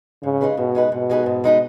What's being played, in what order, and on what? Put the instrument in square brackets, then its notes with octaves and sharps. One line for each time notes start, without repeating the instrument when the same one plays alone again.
[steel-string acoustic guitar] G#2 [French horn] C#3
[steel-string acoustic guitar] G#3 D#4 G#4 B4
[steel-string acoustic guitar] G#2 [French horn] B2
[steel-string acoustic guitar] G#3 D#4 G#4 B4
[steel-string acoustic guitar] G#2 [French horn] B2
[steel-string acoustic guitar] G#3 D#4 G#4 B4
G#2
G#3 D#4 G#4 B4